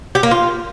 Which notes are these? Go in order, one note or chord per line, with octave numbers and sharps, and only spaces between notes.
G4
A#3
F4